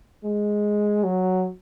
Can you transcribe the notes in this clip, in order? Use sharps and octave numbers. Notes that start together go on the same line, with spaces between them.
G#3
F#3